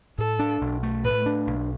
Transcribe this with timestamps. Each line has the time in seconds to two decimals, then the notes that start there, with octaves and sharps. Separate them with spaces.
0.18 A2 A4
0.39 D4
0.61 B1
0.83 A3
1.04 A2 B4
1.26 D4
1.47 B1